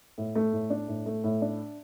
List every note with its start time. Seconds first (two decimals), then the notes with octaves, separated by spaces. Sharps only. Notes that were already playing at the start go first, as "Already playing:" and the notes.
0.18 A2
0.35 A3
0.53 A2
0.70 D4
0.88 A2
1.06 A3
1.24 A2
1.42 D4